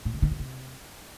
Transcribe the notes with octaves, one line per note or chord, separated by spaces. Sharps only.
A#2
C#3
D#3
B2
C3